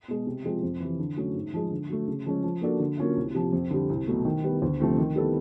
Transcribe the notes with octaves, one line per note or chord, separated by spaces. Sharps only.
B2 G#3
C3
F3 G#3 C4 F4
F2
C3 E3
D3
F#3 A3 C#4
G#2
F3 G#3
D3
F#3 A3
C#3
F3 G#3 C#4
F3
A#3 D4 F#4 A4
D3
F#3 A#3 C#4 F4
C2
C3 F3
F2
D3 G3
C2
B2 F#3 A3
D#3
G3 B3
D2
C3 F3 A3 C4
D#3
G3 B3 E4 A4